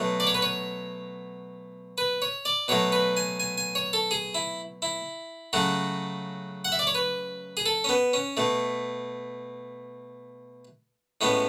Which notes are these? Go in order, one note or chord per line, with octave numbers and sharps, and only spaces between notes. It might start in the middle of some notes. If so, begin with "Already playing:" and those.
Already playing: B2 F#3 A3
D5
C#5
B4
C#5
B4
C#5
D5
B2 F#3 A3 C#5
B4
G#5
G#5
G#5
C#5
A4
G#4
E4
E4
C#3 F#3 A3 F#4
F#5
E5
D5
C#5
B4
G#4
A4
C#4
B3
C#4
B2 A3
A2 G#3 B3 C#4